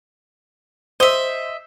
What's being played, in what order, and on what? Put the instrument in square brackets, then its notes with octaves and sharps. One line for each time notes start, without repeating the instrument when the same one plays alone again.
[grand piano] C5 [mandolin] D#5 E5